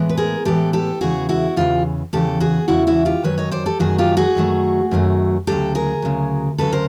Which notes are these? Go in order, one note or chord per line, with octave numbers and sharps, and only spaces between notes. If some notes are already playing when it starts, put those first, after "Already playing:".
Already playing: A2 E3 G#3 B3
B4
G#4 A#4
A2 E3 G#3 B3 G4 A4
G4 A4
E2 C#3 E3 F#4 G#4
E4 F#4
E2 C#3 E3 F4 G4
E2 C#3 E3 G4 A4
F#4 G#4
E2 C#3 E3 E4 F#4
E4 F#4
F4 G4
F#2 D#3 F#3 B4 C#5
C#5 D#5
C5 D5
G4 A4
F#2 D#3 F#3 A3 F#4 G#4
F4 G4
F#4 G#4
F#2 D#3 F#3 A3
F#2 D#3 F#3 A3
D2 C#3 F#3 G4 A4
G#4 A#4
D2 C#3 F#3
D2 C#3 F#3 A4 B4
A#4 C5